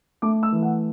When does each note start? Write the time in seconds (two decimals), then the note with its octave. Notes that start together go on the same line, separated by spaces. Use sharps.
0.22 A3 D6
0.43 E6
0.52 E3
0.62 F#5